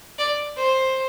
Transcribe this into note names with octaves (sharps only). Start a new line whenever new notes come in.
D5
C5